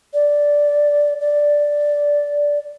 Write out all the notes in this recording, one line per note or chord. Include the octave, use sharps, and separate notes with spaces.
D5
D5